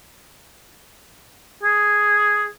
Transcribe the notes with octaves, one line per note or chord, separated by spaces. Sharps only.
G#4